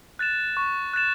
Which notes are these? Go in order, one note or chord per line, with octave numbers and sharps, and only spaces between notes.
F#6 A6 E7
C#6
F#6 A6 E7